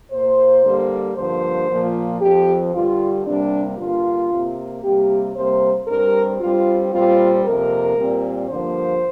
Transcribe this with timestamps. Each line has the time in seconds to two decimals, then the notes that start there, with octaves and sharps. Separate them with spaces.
0.12 A#2 A#3 C5
0.65 G2 D3 G3 A#3
1.16 G2 D3 F3 A#3 C5
1.69 A#2 F3 A#3
2.21 F2 F3 C4 G4
2.74 G2 D3 G3 F4
3.26 C3 G3 A#3 D4
3.78 G2 D3 A#3 F4
4.31 C3 A#3
4.82 C3 G3 A#3 G4
5.35 C3 G3 A#3 C5
5.88 G2 G3 C4 A#4
6.40 G2 G3 C4 F4
6.92 A#2 G3 C4 F4
7.44 F2 C3 A#3 A#4
7.97 A#2 G3 C4
8.49 G2 D3 F3 A#3 C5